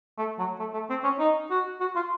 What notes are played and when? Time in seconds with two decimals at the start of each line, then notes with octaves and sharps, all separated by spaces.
0.18 A3
0.38 F#3
0.59 A3
0.74 A3
0.90 C4
1.04 C#4
1.19 D#4
1.50 F#4
1.81 F#4
1.96 F4